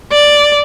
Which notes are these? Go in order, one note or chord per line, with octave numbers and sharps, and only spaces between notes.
D5